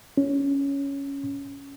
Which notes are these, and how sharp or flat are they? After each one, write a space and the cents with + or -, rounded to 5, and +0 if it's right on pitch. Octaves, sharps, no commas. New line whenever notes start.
C#4 +5